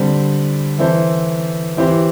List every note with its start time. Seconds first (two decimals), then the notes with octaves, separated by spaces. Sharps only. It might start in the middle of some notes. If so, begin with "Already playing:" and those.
Already playing: D3 G3 C4
0.79 E3 C4 E4 A4 C5
1.77 E3 C4 E4 G4 C5